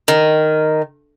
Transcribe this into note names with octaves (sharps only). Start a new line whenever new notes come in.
D#3